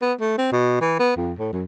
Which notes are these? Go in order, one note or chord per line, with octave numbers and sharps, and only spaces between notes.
B3
A3
C4
B2
E3
B3
F2
A2
F#2